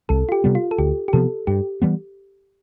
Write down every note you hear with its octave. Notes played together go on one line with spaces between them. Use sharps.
C2 A4
F4
G4
C3 G3 B3
F4
A4
D2 G4
G4
C3 F3 B3 A4
G2 G4
E3 G3 B3